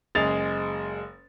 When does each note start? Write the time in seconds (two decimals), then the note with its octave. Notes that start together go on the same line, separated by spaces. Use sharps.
0.15 F#1 G#3 G#4 A6 F7